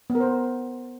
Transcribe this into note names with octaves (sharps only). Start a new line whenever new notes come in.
B3
A#4
C5